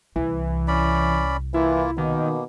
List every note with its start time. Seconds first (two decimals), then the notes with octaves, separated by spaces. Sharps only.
0.16 C2 E3
0.68 C#4 D5 B5
1.54 E3 A#3 E4 F4
1.98 B2 D#3 A#3